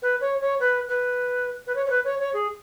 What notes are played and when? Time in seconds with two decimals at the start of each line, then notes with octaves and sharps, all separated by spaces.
0.02 B4
0.21 C#5
0.41 C#5
0.60 B4
0.89 B4
1.67 B4
1.76 C#5
1.86 C#5
1.90 B4
2.05 C#5
2.19 C#5
2.34 G#4